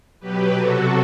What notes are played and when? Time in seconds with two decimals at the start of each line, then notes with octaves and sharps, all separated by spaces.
0.20 B2 F#3 G4 B4
0.55 C3 F#3 F#4 A4